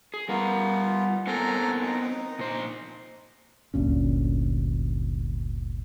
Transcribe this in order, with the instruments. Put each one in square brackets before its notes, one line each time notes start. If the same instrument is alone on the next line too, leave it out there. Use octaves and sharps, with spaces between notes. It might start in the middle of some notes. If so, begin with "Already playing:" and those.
[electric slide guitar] G#4
[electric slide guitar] G3 A#4 [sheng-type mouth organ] B3 F4
[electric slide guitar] B3 C4 A#4 [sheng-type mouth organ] A4 G#5 A#5
[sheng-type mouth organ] D#4
[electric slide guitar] A#2 C5
[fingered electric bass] G1 D2 A#2 C#4